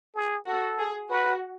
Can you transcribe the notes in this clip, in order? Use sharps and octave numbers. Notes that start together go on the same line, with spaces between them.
G#4
F#4 A4
G#4
F#4 B4